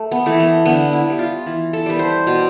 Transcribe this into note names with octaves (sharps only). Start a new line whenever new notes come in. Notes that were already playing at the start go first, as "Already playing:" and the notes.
Already playing: A3
B3
E3 A3
B3
D3 B3
E4
G3 B3
F4
E3
A4
G3 B3 B4
C5
B2